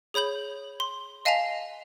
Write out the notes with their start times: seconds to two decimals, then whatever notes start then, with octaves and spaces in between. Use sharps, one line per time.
0.14 G#4 C#5 B5 G6 F#7
0.80 C6
1.25 D#5 F5 G#5 A5 B6 F7